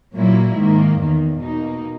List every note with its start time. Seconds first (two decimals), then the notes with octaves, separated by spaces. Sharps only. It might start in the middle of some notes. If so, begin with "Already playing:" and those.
0.14 A#2 F#3 A#3 E4
0.56 G#2 D#3 A#3
0.99 E2 D#3 A#3
1.40 B2 A#3 D#4